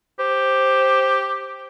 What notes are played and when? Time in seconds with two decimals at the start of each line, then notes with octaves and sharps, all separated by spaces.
0.19 G4 C5